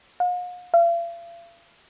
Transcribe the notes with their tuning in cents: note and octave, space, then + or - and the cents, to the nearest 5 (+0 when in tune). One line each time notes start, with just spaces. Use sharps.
F5 +45
F5 -45